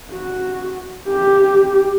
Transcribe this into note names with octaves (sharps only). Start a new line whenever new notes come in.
F#4
G4